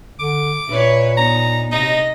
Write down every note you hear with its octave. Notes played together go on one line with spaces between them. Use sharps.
D3 D6
A#2 E4 B4 C#5
B3 D#4 A#5
C3 D#4 D#5